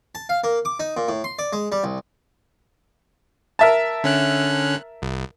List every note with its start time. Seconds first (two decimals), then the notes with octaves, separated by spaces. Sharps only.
0.15 A5
0.29 F5
0.44 A#3
0.65 D6
0.80 D#4
0.97 A#2
1.09 A2
1.24 C6
1.39 D5
1.53 G#3
1.72 G3
1.84 C2
3.59 A#4 E5 A5
4.04 D3 C#4 F#6
5.02 C2